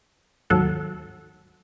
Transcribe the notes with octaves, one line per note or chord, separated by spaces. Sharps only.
D#2 G#2 F#3 A4 F#5